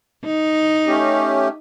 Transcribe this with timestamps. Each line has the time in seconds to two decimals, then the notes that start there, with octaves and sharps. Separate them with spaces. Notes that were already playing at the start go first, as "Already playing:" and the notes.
0.25 D#4
0.87 A3 C#4 G4